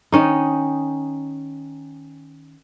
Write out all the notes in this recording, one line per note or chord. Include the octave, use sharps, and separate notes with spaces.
D#3 C#4 D#4